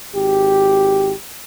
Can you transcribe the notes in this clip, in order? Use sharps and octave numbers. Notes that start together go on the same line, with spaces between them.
G#1 G4